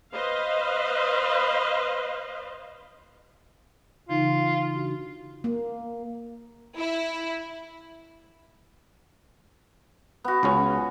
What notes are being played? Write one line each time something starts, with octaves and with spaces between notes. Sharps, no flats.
B4 C5 D#5 F5
C#3 E3 D#4 F4
D4 F#4
A#3
E4
B3 F#4
C#2 C#3 C#4